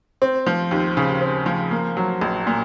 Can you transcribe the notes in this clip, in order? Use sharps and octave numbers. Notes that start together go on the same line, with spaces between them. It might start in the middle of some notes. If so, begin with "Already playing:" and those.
C4
F3
D#2
C#3
C4
F3
A#3
F#3
A#1
A#2